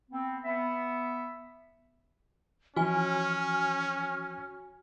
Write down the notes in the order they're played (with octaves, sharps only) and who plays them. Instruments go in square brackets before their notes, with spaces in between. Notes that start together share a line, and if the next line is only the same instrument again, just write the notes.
[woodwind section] B3 C4
B3 E5
[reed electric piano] E3 F3 [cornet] C#4 [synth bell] F#4 G#5 [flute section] F6